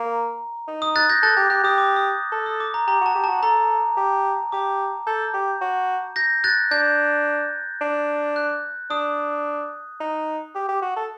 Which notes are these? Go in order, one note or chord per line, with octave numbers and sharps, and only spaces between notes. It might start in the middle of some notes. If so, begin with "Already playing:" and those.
Already playing: A#3 A#5
D#4
D#6
F#6 A6
G6 A#6
A4 F#6 A6
G4 G6
G4 F#6
G4 D#6
D6
D#6
A4
D#6
D6
A#5
G4 A#5
F#4
A5
G4
F#4 A5
A4 A#5
G4
G4 D6
A4 G6
G4
F#4
G6 A#6
F#6 A6
D4 G6
D4
F#6
D4 D#6
D#4
G4
G4
F#4
A4